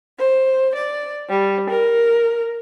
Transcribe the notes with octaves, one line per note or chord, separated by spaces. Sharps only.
C5
D5
G3
A#4